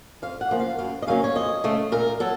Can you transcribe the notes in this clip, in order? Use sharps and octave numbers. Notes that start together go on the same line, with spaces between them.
F2 F5
F#5
C#3 F3 A#3
F5
F#2 F5
D#5
C#3 F#3 A#3 C#4 F5
C#5
F2 D#5
C#3 A3
A#2 A#4
F#3 A4